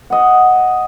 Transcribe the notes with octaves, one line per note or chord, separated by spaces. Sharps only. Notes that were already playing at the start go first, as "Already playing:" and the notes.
D#5 F#5